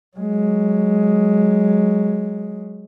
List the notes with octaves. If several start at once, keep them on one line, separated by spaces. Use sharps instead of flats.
F#3 G#3